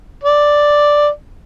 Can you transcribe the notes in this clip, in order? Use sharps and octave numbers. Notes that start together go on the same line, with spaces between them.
D5